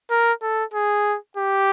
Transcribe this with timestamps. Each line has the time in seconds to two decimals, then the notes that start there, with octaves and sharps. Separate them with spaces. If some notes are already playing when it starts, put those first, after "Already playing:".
0.11 A#4
0.42 A4
0.74 G#4
1.37 G4